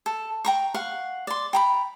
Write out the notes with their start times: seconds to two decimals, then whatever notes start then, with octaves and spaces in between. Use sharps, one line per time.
0.06 A4
0.45 G5 A#5 C#6
0.74 F5 F#5 C#6
1.27 D5 C6
1.53 G5 A#5 B5